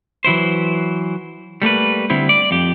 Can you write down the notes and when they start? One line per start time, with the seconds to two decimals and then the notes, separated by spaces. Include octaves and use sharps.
0.24 E3 F#3 E4 C5
1.62 G3 A3 A#3 B4
2.10 D3 G3 C4 E4
2.29 D5
2.51 F2 G4